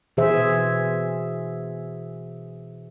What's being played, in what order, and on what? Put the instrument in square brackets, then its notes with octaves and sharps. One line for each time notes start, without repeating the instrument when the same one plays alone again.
[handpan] B2 E3 G#4 C5 E5